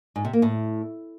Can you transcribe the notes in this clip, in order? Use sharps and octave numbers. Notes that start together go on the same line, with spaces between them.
G#2
C3
A#3
A2